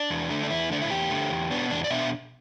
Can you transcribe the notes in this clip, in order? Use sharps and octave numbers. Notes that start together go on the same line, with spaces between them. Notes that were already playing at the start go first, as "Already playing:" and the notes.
Already playing: D4
E2
D3 A3
D4
E2 E4
D3 A3 D4
E4
E2 G4
D3 A3
E2
B2 B3 D4
E2 D4
D5
B2 B3 D4 E5